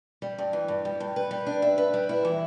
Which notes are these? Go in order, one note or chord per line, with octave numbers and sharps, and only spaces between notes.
G3
G2
E3
G2
G3
G2
B4
G3
D4
E5
B4
G3
E4
E3